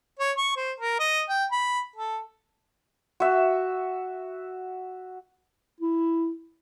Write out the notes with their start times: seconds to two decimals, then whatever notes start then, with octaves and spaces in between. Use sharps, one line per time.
0.19 C#5
0.38 C#6
0.57 C5
0.80 A#4
1.00 D#5
1.29 G5
1.52 B5
1.96 A4
3.20 F#4 E5
5.80 E4